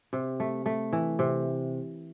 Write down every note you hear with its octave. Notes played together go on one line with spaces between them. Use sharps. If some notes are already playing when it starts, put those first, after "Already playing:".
C3
A3
A3
E3
C3